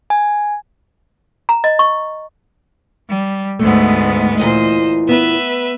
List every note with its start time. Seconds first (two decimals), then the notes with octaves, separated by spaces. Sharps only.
0.10 G#5
1.49 A#5
1.64 D#5
1.79 C#6
3.09 G3
3.59 D2 G#2 A3 B3
4.39 E2 A#2 E3 C5 D#5
5.09 B3 B4 E5